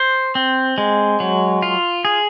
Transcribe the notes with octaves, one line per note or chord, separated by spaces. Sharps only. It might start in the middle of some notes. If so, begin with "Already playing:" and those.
Already playing: C5
C4
G#3
F#3
F4
G#4